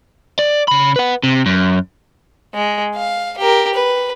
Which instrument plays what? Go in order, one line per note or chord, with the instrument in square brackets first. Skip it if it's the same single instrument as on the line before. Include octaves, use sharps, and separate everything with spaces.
[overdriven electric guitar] D5
C#3 B5
B4 F#5
C3
F#2
[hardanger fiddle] G#3
F5
G4 A#4
B4